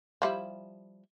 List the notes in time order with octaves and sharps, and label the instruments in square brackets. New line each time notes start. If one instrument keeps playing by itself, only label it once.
[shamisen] F3 G3 E4